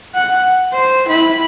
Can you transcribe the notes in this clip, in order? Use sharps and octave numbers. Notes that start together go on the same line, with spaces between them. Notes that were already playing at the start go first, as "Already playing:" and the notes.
F#5
C5
E4 B5